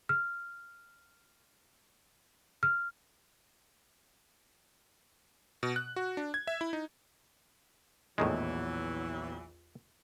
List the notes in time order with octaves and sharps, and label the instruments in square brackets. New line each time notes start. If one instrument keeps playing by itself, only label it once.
[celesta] F6
F6
[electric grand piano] B2
F#6
F#4
D4
G#6
E5
E4
D#4
[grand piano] A#1 E2 [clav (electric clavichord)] A2 D#3 G#3 [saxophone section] E3 F#3